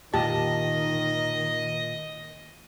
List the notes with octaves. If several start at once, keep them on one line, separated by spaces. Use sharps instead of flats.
A#2 D#3 G4 D#5 A5